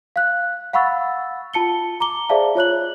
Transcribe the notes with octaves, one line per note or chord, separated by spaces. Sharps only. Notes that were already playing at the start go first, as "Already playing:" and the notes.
F5 F#6
F5 F#5 B5 C#6 E6 A6
F4 A5 C#7 G7
A#5 D6 G7
G#4 C5 D5 E5 F5 A5
F4 C#5 F#6 F#7